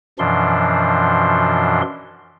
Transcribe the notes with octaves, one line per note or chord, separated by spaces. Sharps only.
F#2 B2 E3 F3 D4 C6